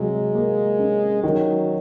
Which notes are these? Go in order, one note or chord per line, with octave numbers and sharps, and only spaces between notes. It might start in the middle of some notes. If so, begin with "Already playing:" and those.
Already playing: C3 F#3 G#3
A#3
C#4
D#3 F#3